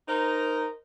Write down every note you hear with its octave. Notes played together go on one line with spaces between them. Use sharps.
D#4 A#4 C5